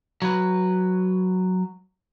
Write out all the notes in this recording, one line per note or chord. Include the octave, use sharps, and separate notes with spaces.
F#3 B4